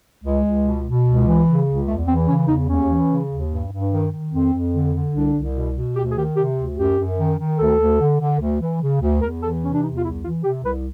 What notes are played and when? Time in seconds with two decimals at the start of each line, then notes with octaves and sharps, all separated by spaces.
0.24 C#2 G#3
0.44 C#2
0.65 B2
0.86 B2
1.06 C#2
1.26 E3
1.47 C#3
1.68 C#2
1.88 E2 A3
2.08 E3 C4
2.28 C#3 C#4
2.48 E2 D#4
2.69 D#2 C#4
2.90 E3
3.10 C#3
3.31 D#2
3.50 G2
3.71 G2
3.92 D#3
4.12 D#3
4.32 F2 C4
4.52 F2
4.73 D3
4.94 D3
5.14 C2 D4
5.34 C2
5.55 B2
5.75 B2
5.96 D2 G4
6.11 G#4
6.16 D#3 G4
6.36 C3 G4
6.57 D2
6.77 F#2 G4
6.98 F#2
7.18 D#3
7.38 D#3
7.59 D2 A4
7.79 D2
8.00 D3
8.21 D3
8.40 D2
8.61 E3
8.82 C#3
9.01 D2
9.22 E2 A#4
9.42 E3 A4
9.63 C3 C#4
9.74 D4
9.83 E2 D#4
9.98 F4
10.04 C2 E4
10.24 E3 F4
10.44 C3 G4
10.64 C2 B4